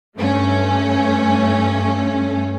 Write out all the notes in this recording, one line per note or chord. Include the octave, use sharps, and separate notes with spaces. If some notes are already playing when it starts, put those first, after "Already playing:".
G2 A3 C#4